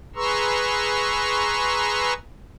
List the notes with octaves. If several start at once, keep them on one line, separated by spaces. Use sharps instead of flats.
G#4 B4 A#5 C6 C#6 E6